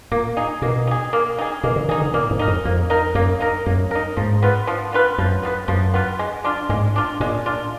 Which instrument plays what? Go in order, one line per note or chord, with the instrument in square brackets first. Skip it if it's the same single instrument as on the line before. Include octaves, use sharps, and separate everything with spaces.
[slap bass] A#2 [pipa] A#3
[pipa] D#4 G#4
[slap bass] B2 [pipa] A#3
[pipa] D#4 G#4
A#3
D#4 G#4
[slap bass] B2 [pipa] A#3
[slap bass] D3
[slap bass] D#3 [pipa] D#4 G#4
[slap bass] D3
[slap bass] A#2 [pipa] A#3
[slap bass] G#2
[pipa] D#4 A#4
[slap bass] F2
[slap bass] F2 [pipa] A#3
[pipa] D#4 A#4
[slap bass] F#2 [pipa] A#3
[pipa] D#4 A#4
[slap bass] F#2 [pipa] A#3
[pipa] D#4 A#4
[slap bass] G#2 [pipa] F3
[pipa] B3 F4 B4
F3
B3 F4 B4
[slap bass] F#2 [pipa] F3
[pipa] B3 F4 B4
[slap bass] F#2 [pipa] F3
[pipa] B3 F4 B4
G#3
D4 F4
[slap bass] G#2 [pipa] G#3
[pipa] D4 F4
[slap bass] A#2 [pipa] G#3
[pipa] D4 F4